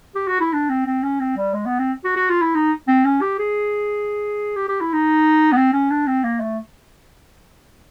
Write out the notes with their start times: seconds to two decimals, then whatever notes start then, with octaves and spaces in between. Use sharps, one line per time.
0.15 G4
0.28 F#4
0.40 E4
0.53 D4
0.69 C4
0.86 C4
1.03 C#4
1.20 C4
1.37 G3
1.54 G#3
1.66 B3
1.79 C4
2.04 F#4
2.16 F#4
2.29 F4
2.42 E4
2.55 D#4
2.88 C4
3.05 C#4
3.21 G4
3.38 G#4
4.56 G4
4.68 G4
4.81 E4
4.93 D#4
5.52 B3
5.57 C4
5.73 C#4
5.90 D4
6.07 C4
6.24 A#3
6.41 A3